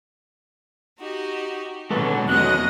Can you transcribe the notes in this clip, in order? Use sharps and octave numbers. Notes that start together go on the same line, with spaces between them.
D#4 F#4 G4
B2 D3 F#3 G#3 A4 B4
E2 F#3 B3 C#4 D#5 F#6